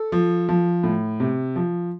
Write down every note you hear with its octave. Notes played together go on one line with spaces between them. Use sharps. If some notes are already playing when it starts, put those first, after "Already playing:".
Already playing: A4
F3
F3
A2
C3
F3